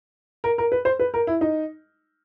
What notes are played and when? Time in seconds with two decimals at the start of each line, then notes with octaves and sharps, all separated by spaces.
0.44 A#4
0.58 A#4
0.72 B4
0.85 C5
0.99 B4
1.14 A#4
1.27 E4
1.41 D#4